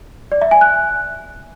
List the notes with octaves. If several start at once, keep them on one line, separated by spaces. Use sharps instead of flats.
D5
E5
G#5
F#6